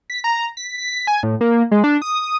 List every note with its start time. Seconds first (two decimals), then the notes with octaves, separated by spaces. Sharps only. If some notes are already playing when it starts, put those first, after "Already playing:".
0.10 B6
0.24 A#5
0.57 B6
0.78 B6
1.07 G#5
1.23 A2
1.41 A#3
1.71 G#3
1.84 D4
2.02 D#6